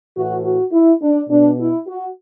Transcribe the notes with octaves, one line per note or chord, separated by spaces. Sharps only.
A2 E3 F#4
F#4
E4
D4
B2 D4
E4
F#4